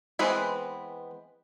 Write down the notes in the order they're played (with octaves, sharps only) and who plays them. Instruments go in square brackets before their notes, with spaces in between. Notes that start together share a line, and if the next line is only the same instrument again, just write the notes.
[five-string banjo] E3 G#3 B3 C4 B4